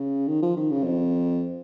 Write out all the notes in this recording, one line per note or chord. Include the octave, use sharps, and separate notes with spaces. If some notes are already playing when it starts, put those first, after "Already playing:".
Already playing: C#3
D#3
F3
D#3
C#3
F2